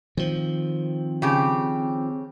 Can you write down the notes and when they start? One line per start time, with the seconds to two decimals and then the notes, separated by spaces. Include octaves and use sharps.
0.17 D#3 F3 C4
1.22 C#3 G4